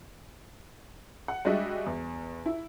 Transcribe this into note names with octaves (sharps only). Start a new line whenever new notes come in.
F#5
G3 G#3 D4 F#4 D#5 E5
E2
E4